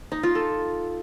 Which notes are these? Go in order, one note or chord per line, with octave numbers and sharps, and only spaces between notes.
D#4
F4
A4